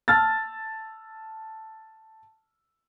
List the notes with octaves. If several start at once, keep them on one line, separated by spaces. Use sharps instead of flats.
A5 E6 F6 A6